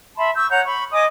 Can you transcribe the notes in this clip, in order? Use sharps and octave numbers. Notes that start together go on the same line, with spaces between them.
E5 A5 B5 C6
C#6 E6 G6
C#5 F#5 A#5 G6
B5 C#6
D#5 G#5 D6 D#6